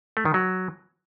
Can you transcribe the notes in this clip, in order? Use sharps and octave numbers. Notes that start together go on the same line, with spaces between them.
A3
D#3
F#3